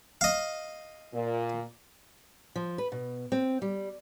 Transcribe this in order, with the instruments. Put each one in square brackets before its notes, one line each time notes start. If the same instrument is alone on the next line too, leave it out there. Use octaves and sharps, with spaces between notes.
[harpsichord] D#5 F5
[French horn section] A#2
[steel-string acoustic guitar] F3
B4
B2
C4
G3